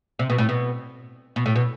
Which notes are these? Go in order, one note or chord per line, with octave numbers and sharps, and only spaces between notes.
C3
B2
A2
B2
B2
A2
B2